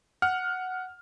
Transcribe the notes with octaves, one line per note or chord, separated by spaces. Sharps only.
F#5 F6